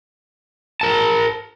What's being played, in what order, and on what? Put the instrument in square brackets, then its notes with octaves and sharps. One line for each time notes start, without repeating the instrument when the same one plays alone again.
[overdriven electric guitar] A#4 A5